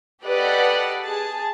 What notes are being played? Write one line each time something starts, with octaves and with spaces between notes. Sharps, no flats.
G4 A4 B4 D5 D#5 F#5
G#4 A5